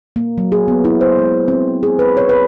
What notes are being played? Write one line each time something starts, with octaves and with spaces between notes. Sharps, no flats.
A#3
F#3
G#4
B3
E4
C5
G#3
C4
G#4
B4
C#5
B4